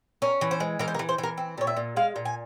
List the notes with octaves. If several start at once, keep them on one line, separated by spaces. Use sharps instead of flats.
C#4 A#4
E3
C5
G#3
E3 A#4
C5
A#4
E3
C5
E3
A#4
C4
A#2 C#5
E5
A#2
G#3 F5
A#2
G#5